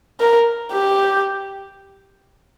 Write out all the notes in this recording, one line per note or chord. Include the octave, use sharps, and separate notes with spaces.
A#4
G4